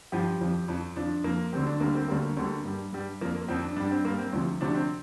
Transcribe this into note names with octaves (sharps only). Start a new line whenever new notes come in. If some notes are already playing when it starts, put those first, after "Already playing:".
G2 F3 G4
F2 F3
F2 F3
F2 F3 D4
F2 F3 A#3
D2 D3 G3 C4
D4
D2 D3 G3 A#3
C4
D2 D3 G3 A#3
D2 D3 G3
G2 G3
G2 G3
F2 F3 A#3
A#3
F2 F3 C4
D4
G2 G3 D4
C4
G2 G3 A#3
C4
D2 C3 F3
D2 C3 F3 D4
C4